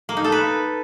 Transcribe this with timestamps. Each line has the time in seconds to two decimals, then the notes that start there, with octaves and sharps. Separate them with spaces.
0.09 A#3
0.17 D#4
0.24 A4
0.32 B4